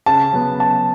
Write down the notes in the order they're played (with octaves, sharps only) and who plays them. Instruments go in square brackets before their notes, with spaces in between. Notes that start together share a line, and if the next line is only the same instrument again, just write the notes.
[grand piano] C#3 A5
F#3 B3
C#3 A5